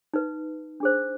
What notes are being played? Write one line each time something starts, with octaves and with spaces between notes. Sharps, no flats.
D#4 B4
D4 G#4 C5